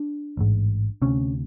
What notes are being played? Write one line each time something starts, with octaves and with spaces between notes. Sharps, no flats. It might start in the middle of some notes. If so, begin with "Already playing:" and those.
Already playing: D4
A1 G#2
D2 C3 C#4